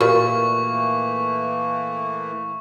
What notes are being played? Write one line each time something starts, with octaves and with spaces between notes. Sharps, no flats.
A#2 E3 A3 A#3 F#4 G4 A#4 C#6